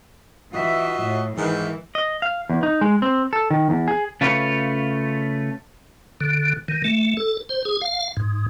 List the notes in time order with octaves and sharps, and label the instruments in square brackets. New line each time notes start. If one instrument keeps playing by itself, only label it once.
[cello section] E3 E5 [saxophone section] F4 F#4 D#5
[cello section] A2
[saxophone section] G#2 D#3 [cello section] E3
[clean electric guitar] D#5
F5
E2
D#4
G#3
C4
A4
D#3
E2
G#4
[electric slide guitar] C#3 A3 F4 B4 C#5
[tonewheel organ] D3
D#3
A3
A4
C5
G#4
F5
G#2